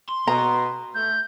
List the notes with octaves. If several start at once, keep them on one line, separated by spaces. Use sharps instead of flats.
C6
B2 A#5
A3 G6